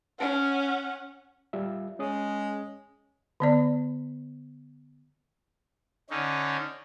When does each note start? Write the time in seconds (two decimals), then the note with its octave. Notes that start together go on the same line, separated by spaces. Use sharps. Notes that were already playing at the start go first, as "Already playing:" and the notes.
0.19 C#4 F#5
1.53 G3 F4 E5
1.99 G#3 C#4 C#5 D#6
3.40 D3 B3 D5
6.10 D3 C#4 D#4